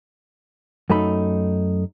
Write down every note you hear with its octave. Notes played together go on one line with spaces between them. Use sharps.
F#2 A3 D#4 B5